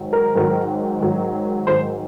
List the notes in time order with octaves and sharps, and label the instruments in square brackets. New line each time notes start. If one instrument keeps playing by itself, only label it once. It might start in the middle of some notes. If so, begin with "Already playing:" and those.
Already playing: [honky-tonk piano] G#2 D#3 F#3
A#4
G#2 D#3 F#3
G#2 D#3 F#3
G#2 D#3 F#3 C5